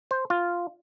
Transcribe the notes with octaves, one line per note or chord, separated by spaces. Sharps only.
C5
F4